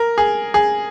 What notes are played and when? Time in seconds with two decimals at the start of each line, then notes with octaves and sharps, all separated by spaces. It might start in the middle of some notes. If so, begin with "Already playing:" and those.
Already playing: A#4
0.18 G#4
0.54 G#4